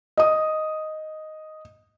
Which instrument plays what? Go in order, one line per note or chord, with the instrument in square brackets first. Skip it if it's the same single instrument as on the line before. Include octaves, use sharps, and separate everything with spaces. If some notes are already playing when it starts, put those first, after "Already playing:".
[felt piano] D#5 D#6